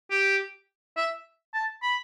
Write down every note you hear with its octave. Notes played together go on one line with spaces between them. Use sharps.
G4
E5
A5
B5